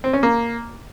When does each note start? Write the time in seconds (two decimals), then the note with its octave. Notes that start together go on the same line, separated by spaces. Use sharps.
0.04 C4
0.13 C#4
0.23 A#3